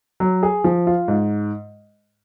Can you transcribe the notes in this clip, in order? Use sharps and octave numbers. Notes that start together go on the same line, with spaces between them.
F#3
G#4
F3
F4
G#2